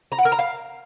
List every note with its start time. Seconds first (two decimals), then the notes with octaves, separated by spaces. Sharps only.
0.12 A#5
0.18 F#5
0.25 A#4
0.32 A#5
0.39 F5